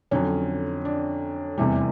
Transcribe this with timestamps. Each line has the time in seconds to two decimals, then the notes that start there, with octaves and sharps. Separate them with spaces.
0.11 F2 D3 F#3 C#4
0.85 D4
1.58 F1 E2 C3 E3 G3